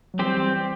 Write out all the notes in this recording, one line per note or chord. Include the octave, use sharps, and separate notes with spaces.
F#3
E3 G3 C4 G4 C5